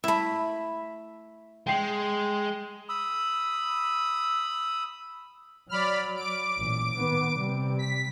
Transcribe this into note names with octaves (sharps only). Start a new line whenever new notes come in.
A3 E4 E5 B5
G#3 G5 C7
B5 D#6 E6
F#3 D5 B5 F6
D6 D7
A1 A#2
D#3 B3
C3 G3
B6